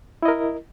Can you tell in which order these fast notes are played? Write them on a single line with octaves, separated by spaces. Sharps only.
E4 D#5 A#4